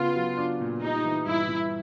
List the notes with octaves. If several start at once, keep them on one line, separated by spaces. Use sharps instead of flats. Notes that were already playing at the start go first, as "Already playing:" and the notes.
Already playing: C#3 B3 F4
F#3
D4
A#2
G3 D#4
E3
G2 E4
G2